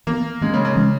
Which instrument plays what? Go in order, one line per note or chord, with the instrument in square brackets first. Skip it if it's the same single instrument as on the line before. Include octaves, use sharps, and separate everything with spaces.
[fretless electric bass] E3 B3 [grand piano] A#3
[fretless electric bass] E3 A#3 C#4 [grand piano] G#3
[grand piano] C#3
C#3
[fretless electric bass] E3 G#3 C#4